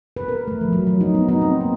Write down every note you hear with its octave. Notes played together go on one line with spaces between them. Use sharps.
B4
A#4
A3
F3
F#3
F#3
D#4
B3
D#4
C4
A#3